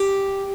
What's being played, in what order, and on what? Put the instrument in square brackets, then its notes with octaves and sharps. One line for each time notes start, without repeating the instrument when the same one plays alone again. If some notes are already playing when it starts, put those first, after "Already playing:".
Already playing: [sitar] G4